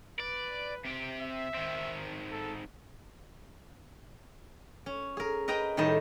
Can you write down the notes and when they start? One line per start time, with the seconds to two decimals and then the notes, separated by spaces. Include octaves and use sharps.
0.20 B4 D5
0.85 C3 G4
1.22 E5
1.54 D#3 C4
2.32 A4
4.86 C#4
5.17 G#4 A#4
5.48 A#4 B4 D#5 G5 A#5
5.77 A2 D#3 G3 G4 D#5 A5